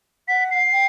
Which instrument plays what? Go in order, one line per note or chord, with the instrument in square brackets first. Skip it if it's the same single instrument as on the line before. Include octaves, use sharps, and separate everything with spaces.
[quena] F#5 [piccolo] B6
[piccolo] C7
[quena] G5